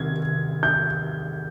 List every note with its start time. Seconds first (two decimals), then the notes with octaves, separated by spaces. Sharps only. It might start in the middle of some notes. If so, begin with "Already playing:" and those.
Already playing: C3 D#3 G#6
0.63 G6